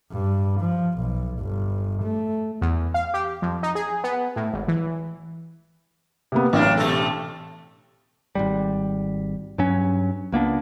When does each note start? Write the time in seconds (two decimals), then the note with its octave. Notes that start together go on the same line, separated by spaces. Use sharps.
0.12 G2
0.61 F3
0.99 B1
1.39 G1
2.03 A3
2.62 E2
2.94 F5
3.14 G4
3.42 F2
3.63 D#4
3.75 G#4
4.04 B3
4.36 A2
4.53 G#1
4.68 E3
6.32 C3 A#3 B3
6.53 A1 F#3 A#3 D4
6.77 B2 A3 A4
8.35 G#1 D#2 G3
9.58 G2 F#3 C#4
10.32 C#2 A#3 B3 D4